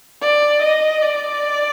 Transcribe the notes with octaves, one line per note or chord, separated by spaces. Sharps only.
D5
D#5
D5